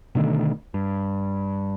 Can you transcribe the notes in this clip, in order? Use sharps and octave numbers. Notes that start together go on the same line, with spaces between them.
B2 D3 D#3 A3
G2